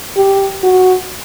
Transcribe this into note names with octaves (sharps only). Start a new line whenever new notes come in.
G4
F#4